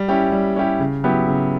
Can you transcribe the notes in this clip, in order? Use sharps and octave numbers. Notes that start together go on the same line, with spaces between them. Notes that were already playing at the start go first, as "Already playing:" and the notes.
Already playing: G3
C#4 E4 G4
G3
C#4 E4 G4
C#3
F#3 B3 E4 G4
C#3